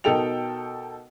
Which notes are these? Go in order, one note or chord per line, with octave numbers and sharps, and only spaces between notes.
B2 D#4 A4 A#4 G5 F7